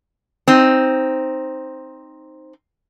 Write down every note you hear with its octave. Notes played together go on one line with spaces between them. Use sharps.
C4 D#4